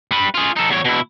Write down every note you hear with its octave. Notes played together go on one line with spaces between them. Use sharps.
G3 B4
F4 G#4
D#4 A4
E2 C#5
B2 E4